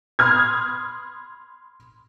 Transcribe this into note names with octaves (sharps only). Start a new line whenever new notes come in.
B5 C6 D#6 F6 G#6